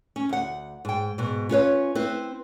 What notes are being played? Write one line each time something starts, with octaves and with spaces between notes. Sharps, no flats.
C#4
D2 F#5
G#2 G5
G#2 B2
C#4 F4 B4 C#5
C4 E4 B4